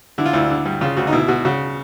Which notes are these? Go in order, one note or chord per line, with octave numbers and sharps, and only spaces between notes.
D3 E4
F4
D2 E4
D3
G2
C#3 F4
D2 F#4
D#4
B2 E4
B2 F#4
C#3 F#4